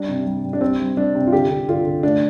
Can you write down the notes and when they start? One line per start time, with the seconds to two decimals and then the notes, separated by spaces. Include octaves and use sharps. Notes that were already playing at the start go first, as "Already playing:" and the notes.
Already playing: G3 D4
0.09 C3
0.26 G3
0.44 G3
0.53 D4
0.61 C3 C4
0.80 G3
0.97 G3 D4
1.15 C3
1.27 F4
1.33 D3 G4
1.50 D3
1.69 D3 F4
1.86 D3
2.03 A3 D4